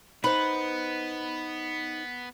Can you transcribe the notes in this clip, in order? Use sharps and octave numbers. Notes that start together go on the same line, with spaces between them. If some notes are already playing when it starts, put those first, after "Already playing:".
B3 D#4 B4 C5